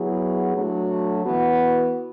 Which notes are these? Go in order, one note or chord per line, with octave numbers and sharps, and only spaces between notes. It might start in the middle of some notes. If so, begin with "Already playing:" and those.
Already playing: F#3 B3 E4 G#4
F#3 A3 D4 F#4
E3 B3 F#4